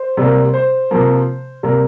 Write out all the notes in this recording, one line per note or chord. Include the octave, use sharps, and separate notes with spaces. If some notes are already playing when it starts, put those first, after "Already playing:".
Already playing: C5
C3 G3 A#3
C5
C3 F3 A#3
C3 G3 A#3